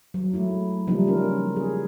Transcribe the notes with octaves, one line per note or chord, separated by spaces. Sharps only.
F#3
G#3 A3 E4
C#3 F3 G3 A#3 D#4 E4
C#4 A#4
G#4